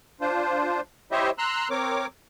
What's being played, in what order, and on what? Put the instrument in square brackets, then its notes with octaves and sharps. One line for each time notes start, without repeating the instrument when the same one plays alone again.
[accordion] D4 F4 C5
E4 G4 C5 C#5 D#5 E5
A#5 C6 E6 F#6
C4 A#4 C#5 D6